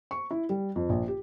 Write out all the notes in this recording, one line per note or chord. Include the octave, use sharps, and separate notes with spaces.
C#6
E4
G3
F2
A#1
G4